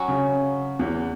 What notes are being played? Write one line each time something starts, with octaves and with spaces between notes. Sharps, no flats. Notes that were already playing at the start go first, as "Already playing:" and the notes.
Already playing: F#3 C#4 F#4
C#3
E2 E3